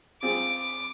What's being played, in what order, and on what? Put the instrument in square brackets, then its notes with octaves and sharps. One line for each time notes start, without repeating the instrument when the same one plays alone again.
[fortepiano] C4 F4 G#4 [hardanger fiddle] D6